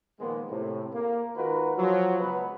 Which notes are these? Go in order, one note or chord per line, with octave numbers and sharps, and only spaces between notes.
A#2 D#3 F3 G#3 A#3 B3
A2 C3
A#3
D#3 G#3 F4 F#4 A#4 B4
F3 F#3
C#2 G#3 B3 B4